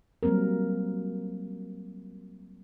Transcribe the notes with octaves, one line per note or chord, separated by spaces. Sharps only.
F#3 G3 A#3 C4 A#4